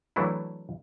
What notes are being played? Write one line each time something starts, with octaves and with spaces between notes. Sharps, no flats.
E3 F#3 A3 D4 E4